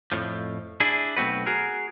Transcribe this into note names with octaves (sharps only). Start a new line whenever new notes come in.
F2 A2 F3
D4 E4 G#4
B1 A3 C4 F#4 B4
F#4 G#4 A#4